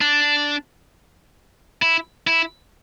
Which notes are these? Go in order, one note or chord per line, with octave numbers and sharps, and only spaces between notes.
D4
E4
E4